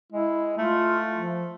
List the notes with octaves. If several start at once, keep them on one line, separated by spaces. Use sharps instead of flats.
G#3 E4
A3 F4
F3